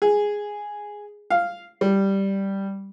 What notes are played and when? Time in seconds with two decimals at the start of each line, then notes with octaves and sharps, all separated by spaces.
0.02 G#4
1.30 F5
1.81 G3